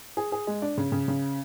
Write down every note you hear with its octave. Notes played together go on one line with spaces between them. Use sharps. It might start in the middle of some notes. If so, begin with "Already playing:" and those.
G#4
G#4
G#3
D4
C#3
C#3
C#3